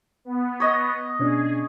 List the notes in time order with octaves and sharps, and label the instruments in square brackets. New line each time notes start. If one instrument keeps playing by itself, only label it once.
[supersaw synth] B3
[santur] C#5 D#5
[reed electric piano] B2 C#4 D4 [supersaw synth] G#4